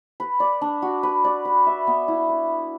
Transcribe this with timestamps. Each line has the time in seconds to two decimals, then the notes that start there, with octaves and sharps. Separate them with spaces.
0.20 B4
0.40 D5
0.62 D4
0.82 F#4
1.03 B4
1.24 D5
1.45 B4
1.67 E5
1.87 B3
2.08 E4
2.29 B4